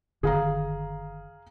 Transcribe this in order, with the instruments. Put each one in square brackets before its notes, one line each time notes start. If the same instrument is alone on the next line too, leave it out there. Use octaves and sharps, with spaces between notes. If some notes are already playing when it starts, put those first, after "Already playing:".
[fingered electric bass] F#1 D3 D#3 [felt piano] G#4 F5 A#5